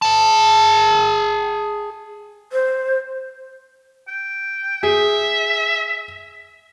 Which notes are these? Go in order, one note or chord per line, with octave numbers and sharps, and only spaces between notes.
G#4 A5
C5
G5
G#4 E5